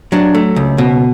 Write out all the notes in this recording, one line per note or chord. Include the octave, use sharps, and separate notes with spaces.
F#3 D4
A3
C#2
B2